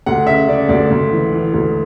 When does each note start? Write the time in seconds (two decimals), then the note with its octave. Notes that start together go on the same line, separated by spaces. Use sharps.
0.06 D2 F#5
0.27 C#3 E5
0.48 C#3 D5
0.69 D2 D5
0.90 D2
1.12 E3
1.32 E3
1.54 D2